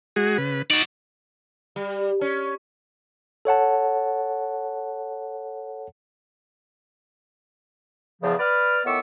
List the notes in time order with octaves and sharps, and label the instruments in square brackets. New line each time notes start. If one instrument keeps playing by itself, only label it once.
[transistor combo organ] G#3 F#4 G#4
C#3 B4
[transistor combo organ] D#4 [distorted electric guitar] F#4 D5
[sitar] G3
C#4
[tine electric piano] A4 C#5 F#5 A5
[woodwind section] E2 C#3 F3
B4 D5 F6
A2 D#3 B3 C#6 D6 E6